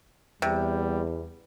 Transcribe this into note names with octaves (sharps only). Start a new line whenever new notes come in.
E2 C3 G3